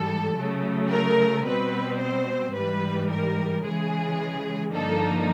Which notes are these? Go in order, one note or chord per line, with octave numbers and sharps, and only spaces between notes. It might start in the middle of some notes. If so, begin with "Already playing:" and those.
Already playing: G#2 E3 G3 A4
C#3 F#3 A3
A#4
B2 G3 C4 B4
C5
G#2 E3 G3 B4
A#4
C#3 E3 G#3 G#4
G2 D3 F3 A#3 D#4 A4